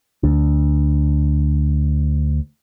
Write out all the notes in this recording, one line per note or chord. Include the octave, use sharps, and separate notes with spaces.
D2 D4